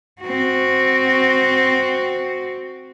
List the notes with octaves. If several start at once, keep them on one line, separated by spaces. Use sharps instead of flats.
C4 F#4